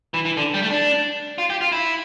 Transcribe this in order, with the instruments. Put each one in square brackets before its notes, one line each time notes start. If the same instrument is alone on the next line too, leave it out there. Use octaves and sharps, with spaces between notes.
[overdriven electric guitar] E3
E3
D3
G3
A3
D4
F4
G4
F4
E4